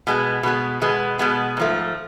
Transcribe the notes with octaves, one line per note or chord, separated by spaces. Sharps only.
B2 G#3 B3
B2 G#3 B3
B2 G#3 B3
B2 G#3 B3
G#2 F3 A3